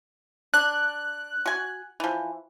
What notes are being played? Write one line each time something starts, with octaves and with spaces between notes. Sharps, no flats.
D4 F#6
F#4 G#5
E3 F3